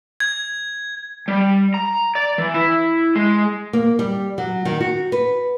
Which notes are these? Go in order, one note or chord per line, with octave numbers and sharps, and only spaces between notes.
G#6
G3
A#5
D5
E3
E4
G#3
A#3
G3
F#3
D#3
F#4
B4